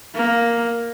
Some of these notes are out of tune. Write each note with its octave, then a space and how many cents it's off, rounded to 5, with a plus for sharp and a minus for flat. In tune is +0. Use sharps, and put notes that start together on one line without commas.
A#3 +5